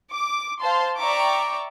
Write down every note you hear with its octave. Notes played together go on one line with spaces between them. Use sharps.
D6
C5 F5 A5 C6
D5 E5 G5 A#5 C#6 D6